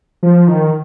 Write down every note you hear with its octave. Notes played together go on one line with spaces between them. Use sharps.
F3
D#3